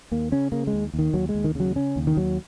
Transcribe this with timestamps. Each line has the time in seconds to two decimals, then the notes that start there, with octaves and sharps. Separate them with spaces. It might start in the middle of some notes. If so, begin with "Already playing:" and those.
0.11 D#2 A#3
0.32 C#3 C#4
0.52 C#3 A#3
0.67 G#3
0.73 D#2
0.94 D#2
0.99 D#3
1.14 D#2 F#3
1.29 G#3
1.35 D#2
1.44 D#3
1.55 C#3 F#3
1.75 C#3 C#4
1.96 D#2
2.07 D#3
2.17 D#2 F#3